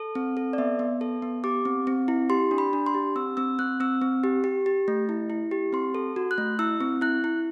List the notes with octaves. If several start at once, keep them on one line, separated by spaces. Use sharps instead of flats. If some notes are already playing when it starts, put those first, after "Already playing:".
Already playing: A4
C4
A4
D5
B3 E5
B3
A4
B3
G4 D6
C4
C4
E4
G4 C6
D4
B5
D4
C6
G4
C4 E6
C4 E6
C4 F#6
C4 E6
C4
G4
G4
G4
A3
E4
E4
G4
C4 C6
A4
F#4
F#6
A3
E4 E6
C4
E4 F#6
E4